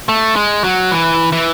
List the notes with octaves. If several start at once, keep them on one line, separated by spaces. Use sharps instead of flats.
A3
G#3
F#3
E3
E3